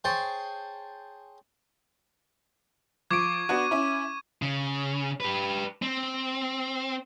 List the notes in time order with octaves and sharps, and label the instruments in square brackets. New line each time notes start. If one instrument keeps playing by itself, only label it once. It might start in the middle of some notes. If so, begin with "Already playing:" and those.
[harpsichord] G#4 C5 C#5 G5 A5
[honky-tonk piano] F3 D7 [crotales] C#6 D6 G#6
[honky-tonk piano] B3 D4 F#4 [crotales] D#7
[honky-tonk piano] C#4 E4
[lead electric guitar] C#3
G4 B4
C4